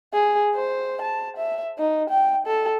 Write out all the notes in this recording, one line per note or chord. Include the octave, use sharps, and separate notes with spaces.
G#4
C5
A5
E5
D#4
G5
A4